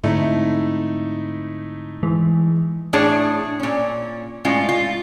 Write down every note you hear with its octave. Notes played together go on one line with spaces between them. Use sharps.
G#2 D3 A3 C4 D#4 E4
E3 G#3
A2 D4 G#4 C#5 A5
A#2 C#4
A2 G#3 C#4 F4
F4